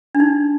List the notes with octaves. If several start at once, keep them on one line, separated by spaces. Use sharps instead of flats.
D4
D#4